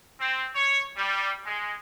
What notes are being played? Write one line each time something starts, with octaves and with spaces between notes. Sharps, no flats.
C4
C#5
G3
G#3